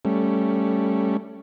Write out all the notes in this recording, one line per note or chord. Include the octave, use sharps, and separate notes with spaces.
G3 A3 C#4